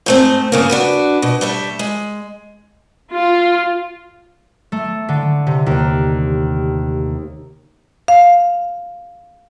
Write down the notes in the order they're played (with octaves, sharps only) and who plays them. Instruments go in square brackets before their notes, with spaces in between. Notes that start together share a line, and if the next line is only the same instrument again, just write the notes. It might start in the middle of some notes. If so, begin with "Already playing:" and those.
[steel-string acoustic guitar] G#2 A3 C4
G2 C#3 A#3
D4 F#4 B4
B2
G3 A3 E5
G#3
[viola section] F4
[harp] A3
D3
C3
D#2
[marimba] F5